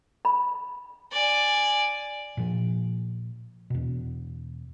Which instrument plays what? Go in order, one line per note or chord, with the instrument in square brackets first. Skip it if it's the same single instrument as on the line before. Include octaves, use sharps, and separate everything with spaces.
[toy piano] B5
[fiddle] D5 G#5
[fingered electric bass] A#2 F3
E2 B2